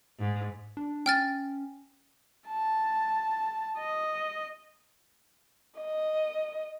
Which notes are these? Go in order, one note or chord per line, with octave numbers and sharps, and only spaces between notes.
G#2
D4
C#4 G5 F6 A6
A5
D#5
D#5